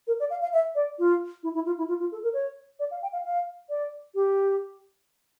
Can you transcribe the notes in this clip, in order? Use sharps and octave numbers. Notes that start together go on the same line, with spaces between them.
A#4
D5
F5
F5
E5
D5
F4
E4
E4
F4
E4
F4
F4
A4
A#4
C#5
D5
F5
G5
F5
F5
D5
G4